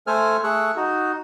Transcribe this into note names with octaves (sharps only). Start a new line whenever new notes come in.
A3 A4 C5 G#5 F6
A3 G#4 C#6 E6 F#6
D#4 F#4